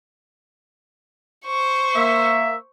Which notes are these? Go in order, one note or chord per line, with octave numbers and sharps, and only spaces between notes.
C5 C#6
A#3 E5